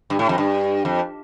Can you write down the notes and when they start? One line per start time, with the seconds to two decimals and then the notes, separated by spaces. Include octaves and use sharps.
0.10 G2
0.19 A2
0.29 F2
0.38 G2
0.85 F2